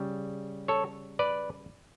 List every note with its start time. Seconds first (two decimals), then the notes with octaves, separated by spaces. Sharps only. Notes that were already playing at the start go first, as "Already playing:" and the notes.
Already playing: C#3 G3
0.68 A4 C#5
1.19 B4 D5